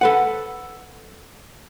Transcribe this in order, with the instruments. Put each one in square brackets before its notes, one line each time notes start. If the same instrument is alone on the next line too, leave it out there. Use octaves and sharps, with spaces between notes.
[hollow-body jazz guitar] A4 B4 F#5